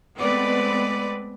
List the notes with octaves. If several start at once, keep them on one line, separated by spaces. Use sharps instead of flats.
G#3 A3 B3 C4 B4 D5